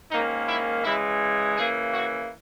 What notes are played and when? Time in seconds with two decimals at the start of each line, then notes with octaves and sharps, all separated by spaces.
0.10 G#2 D#3 A#3 C#4 D#4
0.47 E4
0.84 C#3 E3 G#3 E4
1.57 C#3 E3 A#3 G#4
1.94 F#4